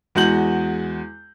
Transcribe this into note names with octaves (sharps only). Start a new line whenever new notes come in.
E2 G#3 F#4 F#5 G6 F#7